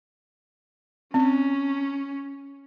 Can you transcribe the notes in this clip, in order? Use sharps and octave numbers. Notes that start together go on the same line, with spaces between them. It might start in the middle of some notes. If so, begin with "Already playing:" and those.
C4 C#4